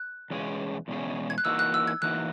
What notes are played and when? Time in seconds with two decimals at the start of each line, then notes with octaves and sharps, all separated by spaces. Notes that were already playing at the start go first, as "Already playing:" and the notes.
Already playing: F#6
0.30 E2 B2 G#3 C#4 G#4
0.88 E2 B2 G#3 C#4 G#4
1.30 G#6
1.38 F#6
1.45 E3 A#3 D#4 F#4 E6
1.59 F#6
1.74 E6
1.88 G#6
2.02 E3 A#3 D#4 F#4 F#6